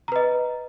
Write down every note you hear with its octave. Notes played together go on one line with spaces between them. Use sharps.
B4 D#5 A#5